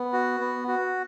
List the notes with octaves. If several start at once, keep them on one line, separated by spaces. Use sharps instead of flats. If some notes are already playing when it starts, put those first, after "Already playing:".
Already playing: B3
F#4
B3
F#4